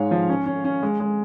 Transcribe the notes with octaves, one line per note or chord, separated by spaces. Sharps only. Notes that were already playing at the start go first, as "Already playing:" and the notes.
Already playing: G#2 G#3 C#5 F5
F3
C#4
C#4
C#4
G#3
G#3